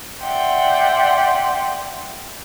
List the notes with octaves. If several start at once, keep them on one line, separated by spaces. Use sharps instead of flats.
D5 E5 F#5 G5 C6